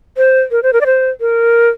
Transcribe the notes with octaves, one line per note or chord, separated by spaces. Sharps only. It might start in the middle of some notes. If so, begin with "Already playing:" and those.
C5
A#4
C5
A#4
D5
C5
A#4